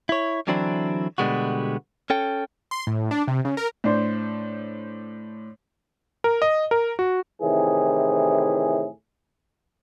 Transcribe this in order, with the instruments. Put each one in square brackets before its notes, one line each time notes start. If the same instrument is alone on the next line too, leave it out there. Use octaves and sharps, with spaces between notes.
[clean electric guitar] E4 C#5
D3 E3 F#3 C4 D4 E4
B2 D3 G3 G#3 B3 F#4
C#4 A4 G5
[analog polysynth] C6
A2
D4
C3
C#3
A#4
[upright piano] A2 D4 C5
[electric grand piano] A#4
D#5
A#4
F#4
[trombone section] A2 C3 D#3 E3 E4 G#4